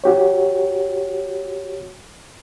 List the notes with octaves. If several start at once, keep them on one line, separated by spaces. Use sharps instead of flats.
F#4 G4 C#5